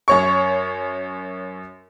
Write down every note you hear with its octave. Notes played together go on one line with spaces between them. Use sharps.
F#2 C#5 C#6